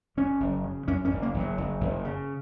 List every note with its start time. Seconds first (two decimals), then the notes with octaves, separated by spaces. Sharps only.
0.17 F#1 C#4
0.40 F#1
0.64 C#3
0.88 F#2 C#4
1.05 C#4
1.11 F#1
1.22 A#3
1.34 F#1
1.40 F#3
1.58 F#1
1.81 F#1
2.04 C#3